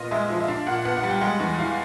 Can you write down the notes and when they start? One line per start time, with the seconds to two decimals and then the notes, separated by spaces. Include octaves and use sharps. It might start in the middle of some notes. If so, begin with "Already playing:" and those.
Already playing: A#2 B3 D#5
0.11 G#3 E5
0.30 F3
0.40 E5
0.48 D4 F5
0.66 A#2 F#5
0.85 B3 F#5
0.97 F#5
1.03 G3
1.10 G5
1.21 G#3 F#5
1.40 E2
1.58 E3 F5